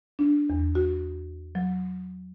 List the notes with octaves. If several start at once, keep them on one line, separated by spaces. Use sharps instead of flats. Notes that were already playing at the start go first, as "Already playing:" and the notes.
D4
E2
F#4
F#3